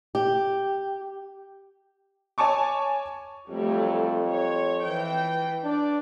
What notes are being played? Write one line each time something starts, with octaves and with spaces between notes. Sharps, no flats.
G4
C#5 G#5 A5 C#6 D6
F2 F#3 G3 A3
C#5
E3 G5
D4 D5